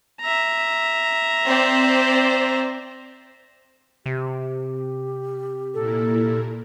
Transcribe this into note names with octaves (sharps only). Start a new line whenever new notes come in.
E5 A#5
C4 C5 D5
C3 G4
A#2 A#3 E4 A4